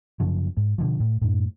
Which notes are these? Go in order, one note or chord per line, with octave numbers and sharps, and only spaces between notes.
F#2 C#3 F3
G#2
B2 D3 F3
A2
F#2 A2